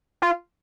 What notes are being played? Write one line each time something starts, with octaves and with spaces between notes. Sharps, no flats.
F4